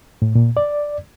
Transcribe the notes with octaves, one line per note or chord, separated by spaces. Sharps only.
A2
A#2
D5